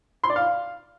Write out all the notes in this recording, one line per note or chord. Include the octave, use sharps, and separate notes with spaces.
C6
D5
F5